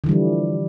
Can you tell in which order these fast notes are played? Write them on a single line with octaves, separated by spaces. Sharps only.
D3 E3 G3 F3